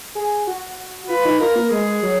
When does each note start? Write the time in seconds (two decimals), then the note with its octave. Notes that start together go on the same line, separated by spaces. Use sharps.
0.15 G#4
0.47 F#4
1.09 F4 B4
1.25 D#4
1.40 F4 A#4
1.56 A#3
1.71 G#3 G#4
2.03 F#3